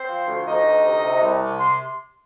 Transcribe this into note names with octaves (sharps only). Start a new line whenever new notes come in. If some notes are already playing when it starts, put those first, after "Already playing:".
Already playing: C4 C5
F3
D2
D2 D#4 D#5
D2
C3
C3
C2
C3
C6